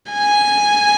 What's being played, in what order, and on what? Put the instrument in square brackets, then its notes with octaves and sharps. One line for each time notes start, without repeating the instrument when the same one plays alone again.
[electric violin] G#5